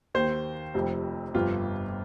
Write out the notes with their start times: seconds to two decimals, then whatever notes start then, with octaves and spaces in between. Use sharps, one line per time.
0.15 D#2 D#3 C5
0.74 F1 F2 C3 F3
1.34 G1 F2 C3 F4